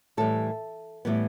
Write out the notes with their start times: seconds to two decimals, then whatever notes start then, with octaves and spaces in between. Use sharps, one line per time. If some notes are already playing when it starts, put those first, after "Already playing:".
0.17 A2 E3 G3 A4
1.05 A2 E3 G3 B3